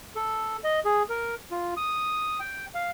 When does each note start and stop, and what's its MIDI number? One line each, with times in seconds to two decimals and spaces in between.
0.16 0.57 69
0.64 0.80 75
0.85 1.03 68
1.09 1.35 70
1.51 1.74 65
1.77 2.39 87
2.40 2.66 79
2.74 2.91 77